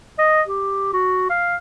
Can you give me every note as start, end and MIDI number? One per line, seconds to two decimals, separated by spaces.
0.19 0.42 75
0.47 0.91 67
0.93 1.29 66
1.30 1.56 77